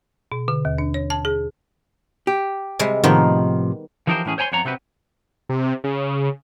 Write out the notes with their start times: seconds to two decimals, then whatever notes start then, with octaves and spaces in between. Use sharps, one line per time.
0.32 B2
0.48 D3
0.65 D#2
0.78 D4
0.94 C#5
1.10 A5
1.25 G#4
2.27 G4
2.79 C3 G3 G#3
3.04 A2 C3 D#3 F3 A#3 B3
4.07 E3 F3 D#4 G4 A#4 C5
4.25 A2 E3 C#4 G#4
4.38 C5 C#5 G#5 A#5 C6
4.52 F2 B3 C#5 A#5
4.65 C3 C4 F#4 B4
5.49 C3
5.84 C#3